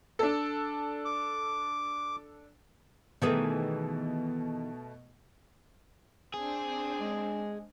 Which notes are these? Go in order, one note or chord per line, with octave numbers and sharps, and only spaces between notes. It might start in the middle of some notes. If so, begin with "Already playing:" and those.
D4 A4
D6
B2 D#3 E3 A3 G#4
C4 D4 G#4
G#3